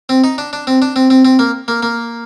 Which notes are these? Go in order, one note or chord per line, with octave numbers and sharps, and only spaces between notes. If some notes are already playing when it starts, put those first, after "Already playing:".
C4
D#4
D4
D4
C4
D4
C4
C4
C4
A#3
A#3
A#3